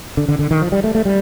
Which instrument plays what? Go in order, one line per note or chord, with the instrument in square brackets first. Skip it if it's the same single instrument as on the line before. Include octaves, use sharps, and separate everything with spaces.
[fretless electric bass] D3
D3
D3
D#3
F3
G3
A3
A3
G3